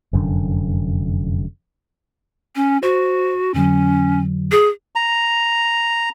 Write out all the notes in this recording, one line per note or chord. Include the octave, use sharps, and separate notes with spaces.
F1 F#2 D3
C#4
F#4 C5
F2 D3 F#3 C#4
G#4
A#5